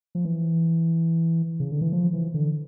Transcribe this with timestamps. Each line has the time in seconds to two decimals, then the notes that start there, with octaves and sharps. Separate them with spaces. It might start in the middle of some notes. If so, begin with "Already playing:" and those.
0.15 F3
0.25 E3
1.60 C#3
1.71 D3
1.81 E3
1.93 F3
2.13 E3
2.34 D3